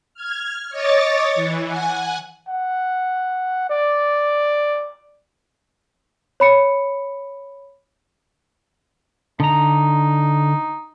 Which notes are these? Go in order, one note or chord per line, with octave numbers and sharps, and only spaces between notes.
F6 G#6
C#5 D#5 C#6 D6 A6
E3
F#5 G#5
F#5
D5
C#5 B5 C#7
D3 D#4 A#5